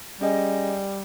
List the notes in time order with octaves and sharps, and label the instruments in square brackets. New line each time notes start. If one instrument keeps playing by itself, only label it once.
[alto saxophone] G3 [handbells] C#4 G#4 D#5 G#5